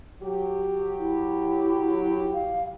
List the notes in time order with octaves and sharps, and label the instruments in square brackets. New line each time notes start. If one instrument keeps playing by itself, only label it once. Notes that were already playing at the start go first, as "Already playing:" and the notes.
[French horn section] F#3 G4
[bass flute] E4
F5